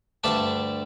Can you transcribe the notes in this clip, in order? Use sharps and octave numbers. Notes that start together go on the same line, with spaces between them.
D2 G2 D4 E5 A5